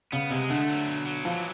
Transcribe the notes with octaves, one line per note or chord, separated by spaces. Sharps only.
C#3 B3
C3 G#3
D3 A3
F#3
B2
F#3
E3 F3